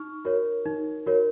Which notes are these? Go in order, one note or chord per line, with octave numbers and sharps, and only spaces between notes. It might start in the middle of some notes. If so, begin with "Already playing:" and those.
Already playing: D#4 C#6 F6
F#4 A#4 C#5
D#4
F#4 A#4 C#5